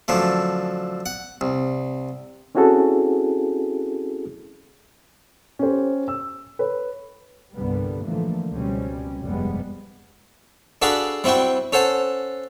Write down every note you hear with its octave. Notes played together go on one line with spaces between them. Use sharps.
F#2 D3 F3 A3
F#5
C2
C4 C#4 E4 F#4 G#4 A4
C#4 G4 C5
E6
B4 C#5
C2 G2 D3 G3 A#3 B3
A2 D3 E3 F3 A3 A#3
C#2 B2 G3 C4 C#4
F1 G2 C3 G3 G#3 B3
D4 F#4 G#4 A4 B4 F5
G3 C4 E4 F#4 G5
C#4 A4 C5 F#5 A5